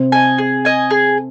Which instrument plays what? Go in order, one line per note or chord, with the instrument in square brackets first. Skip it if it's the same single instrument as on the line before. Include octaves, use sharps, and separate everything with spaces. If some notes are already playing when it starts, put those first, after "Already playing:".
Already playing: [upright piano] C3 C4
[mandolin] D#5 G#5
G#4
D#5 G#5
G#4